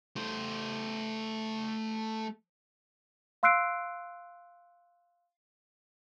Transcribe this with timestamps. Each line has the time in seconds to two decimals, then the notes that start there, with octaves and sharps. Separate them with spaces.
0.17 A3 C5
3.43 F5 C6 E6 F#6 C7 D7